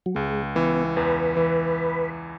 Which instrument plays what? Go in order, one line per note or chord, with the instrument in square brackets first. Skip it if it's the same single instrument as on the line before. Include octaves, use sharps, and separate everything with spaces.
[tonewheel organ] F#3
[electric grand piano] C#2 [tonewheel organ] G#3
[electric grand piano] E3 [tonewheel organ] B3
[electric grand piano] E2 [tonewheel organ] B4
[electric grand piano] E3